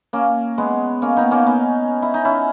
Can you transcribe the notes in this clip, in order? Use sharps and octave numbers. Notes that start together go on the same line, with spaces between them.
A#3 C#4
G#3 B3
A#3 C#4
B3 D#4
A#3 C#4
B3 D#4
E4
D#4
C#4 E4